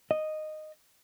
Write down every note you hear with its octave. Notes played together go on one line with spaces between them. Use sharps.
D#5